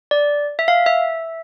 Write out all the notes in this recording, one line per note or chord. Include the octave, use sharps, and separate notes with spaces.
D5
E5
F5
E5